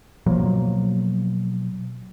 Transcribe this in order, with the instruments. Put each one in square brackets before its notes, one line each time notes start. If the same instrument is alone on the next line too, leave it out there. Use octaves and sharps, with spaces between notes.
[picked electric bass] B2 F3 F#3 A#3